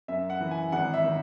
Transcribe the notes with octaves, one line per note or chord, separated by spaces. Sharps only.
F#2 E5
F#5
E3
G#5
G#1 F#5
E5
D#3